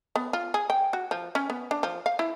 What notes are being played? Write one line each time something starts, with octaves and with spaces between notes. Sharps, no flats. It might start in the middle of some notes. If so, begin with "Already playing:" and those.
B3
F4
G#4
G5
F#4
F3
C#4
B3
D4
F3
F5
E4